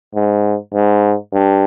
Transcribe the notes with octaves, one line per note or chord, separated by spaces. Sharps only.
G#2
G#2
G2